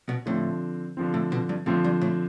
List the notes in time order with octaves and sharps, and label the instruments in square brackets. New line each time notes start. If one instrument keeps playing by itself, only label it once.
[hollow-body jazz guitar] B2
[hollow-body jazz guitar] A2 [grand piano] D3 F3 C4
[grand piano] D3 F3 C4
[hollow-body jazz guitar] A2
B2
G2
[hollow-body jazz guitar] A2 [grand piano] D3 F3 C4
[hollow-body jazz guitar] G2
A2